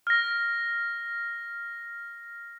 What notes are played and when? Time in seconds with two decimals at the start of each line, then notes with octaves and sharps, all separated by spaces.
0.07 F6 A#6